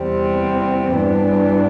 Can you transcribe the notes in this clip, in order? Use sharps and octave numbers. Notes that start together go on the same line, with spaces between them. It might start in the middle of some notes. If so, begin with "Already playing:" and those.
Already playing: E2 C3 G3 C4
G2 E3 B3 D4